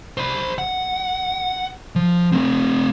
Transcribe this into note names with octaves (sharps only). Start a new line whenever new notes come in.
C5 B5
F#5
F3
A3 C4